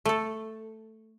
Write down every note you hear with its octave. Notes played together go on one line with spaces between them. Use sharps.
A3 A4